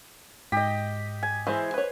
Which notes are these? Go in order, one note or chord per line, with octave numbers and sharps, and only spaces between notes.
G#2 G4 D#5 B6
G#5
E3 G#3 E4 C5
B4 C#5